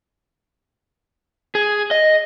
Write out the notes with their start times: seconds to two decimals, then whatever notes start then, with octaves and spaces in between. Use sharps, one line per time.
1.55 G#4
1.91 D#5